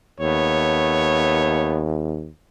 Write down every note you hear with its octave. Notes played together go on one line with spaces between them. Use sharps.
D#2 A3 B3 C#5